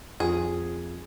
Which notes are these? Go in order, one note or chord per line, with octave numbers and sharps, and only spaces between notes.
F2 F3 G#4